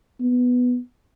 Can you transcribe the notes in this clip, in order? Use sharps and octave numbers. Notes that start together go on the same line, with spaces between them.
B3